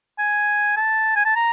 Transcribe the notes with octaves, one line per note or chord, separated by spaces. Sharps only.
G#5
A5
G#5
A5
A#5